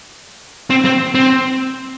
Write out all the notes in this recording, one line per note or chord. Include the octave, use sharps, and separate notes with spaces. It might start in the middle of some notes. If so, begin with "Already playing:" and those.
C4
C4
C4